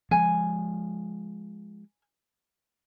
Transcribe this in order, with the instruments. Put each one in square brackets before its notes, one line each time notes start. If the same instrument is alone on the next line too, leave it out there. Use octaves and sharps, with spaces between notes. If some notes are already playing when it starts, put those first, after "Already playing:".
[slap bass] F3 G#3 [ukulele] G#5